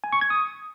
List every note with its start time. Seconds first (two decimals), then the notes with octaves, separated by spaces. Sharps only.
0.04 G#5
0.13 C#6
0.21 G#6
0.30 D#6